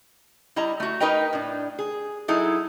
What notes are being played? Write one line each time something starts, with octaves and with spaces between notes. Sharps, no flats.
G3 E4 D#5 A#5
A3 F#4
D#4 A#4 B4 D#5 G5
A2 D4
G#4
F#3 D#4 E4 G#4 A4